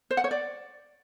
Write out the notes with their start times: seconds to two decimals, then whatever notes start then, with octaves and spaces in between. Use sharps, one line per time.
0.11 C5
0.17 F#5
0.24 C#5
0.31 D5